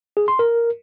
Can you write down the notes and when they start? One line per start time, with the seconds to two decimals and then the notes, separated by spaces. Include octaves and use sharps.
0.17 G#4
0.28 C6
0.39 A#4